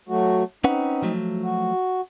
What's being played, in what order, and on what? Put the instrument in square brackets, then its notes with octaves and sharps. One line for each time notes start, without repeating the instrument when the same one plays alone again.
[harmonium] F#3 A3 F#4
[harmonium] C4 D#4 [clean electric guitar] C#4 B4 F#5
[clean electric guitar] F3 F#3 A3
[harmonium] F#4